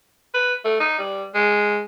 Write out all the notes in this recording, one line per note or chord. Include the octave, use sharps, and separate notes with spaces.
B4
A3
D#4
G3
G#3